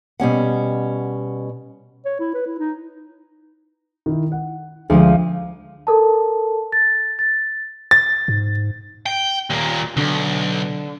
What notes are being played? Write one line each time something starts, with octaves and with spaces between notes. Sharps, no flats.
B2 G3 C#4 F#5
C#5
E4
B4
E4
D#4
D#3 E4
F#5
D2 F3 G#3 D#7
A4 A#4 A5
A6
A6
A6
G#2
G5
D#2 A#2
B1 D3 D4